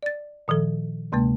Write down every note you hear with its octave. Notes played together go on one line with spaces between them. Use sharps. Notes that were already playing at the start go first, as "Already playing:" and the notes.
D5 A6
A#2 D#3 F3 A4
D2 C3 G#3 A#3